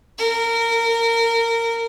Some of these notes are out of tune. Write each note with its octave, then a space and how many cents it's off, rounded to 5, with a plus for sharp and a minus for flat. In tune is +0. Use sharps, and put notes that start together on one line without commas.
A#4 -20